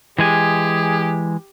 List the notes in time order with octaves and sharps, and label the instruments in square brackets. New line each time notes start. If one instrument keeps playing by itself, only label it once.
[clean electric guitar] E3 G#3 G#5 [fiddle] G4 [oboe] G#4